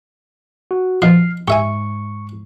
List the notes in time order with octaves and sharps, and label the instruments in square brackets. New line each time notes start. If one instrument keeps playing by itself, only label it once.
[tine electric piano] F#4
[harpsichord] B2 F3 [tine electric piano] F6 C7
[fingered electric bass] G#2 [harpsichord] G4 E5 G#5 [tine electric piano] C#6